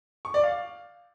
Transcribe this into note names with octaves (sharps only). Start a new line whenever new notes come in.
C#6
D5
F5